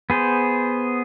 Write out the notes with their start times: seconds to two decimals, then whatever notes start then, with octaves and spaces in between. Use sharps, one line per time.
0.10 B3 G#4 C5